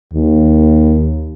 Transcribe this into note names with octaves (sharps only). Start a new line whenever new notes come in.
D#2